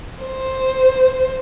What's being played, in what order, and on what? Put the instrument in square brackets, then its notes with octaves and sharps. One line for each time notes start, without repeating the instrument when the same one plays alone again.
[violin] C5